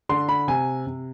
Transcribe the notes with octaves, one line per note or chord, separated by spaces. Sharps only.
D3 C6
B5
C3 G#5
C3